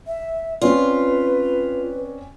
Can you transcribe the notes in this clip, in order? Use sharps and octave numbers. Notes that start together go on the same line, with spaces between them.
E5
C4 C#4 F4 B4 D5